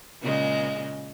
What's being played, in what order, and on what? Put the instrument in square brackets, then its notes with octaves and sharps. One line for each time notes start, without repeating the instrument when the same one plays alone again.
[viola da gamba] A#2 C#3 G#3